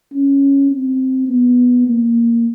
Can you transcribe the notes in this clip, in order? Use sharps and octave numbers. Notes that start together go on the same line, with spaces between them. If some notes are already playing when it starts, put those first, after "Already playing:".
C#4
C4
B3
A#3